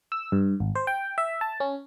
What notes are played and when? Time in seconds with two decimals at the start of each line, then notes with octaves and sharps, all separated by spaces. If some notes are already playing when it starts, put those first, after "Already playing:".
0.12 E6
0.32 G2
0.60 G#1
0.75 C5
0.87 G5
1.18 E5
1.41 A5
1.60 C#4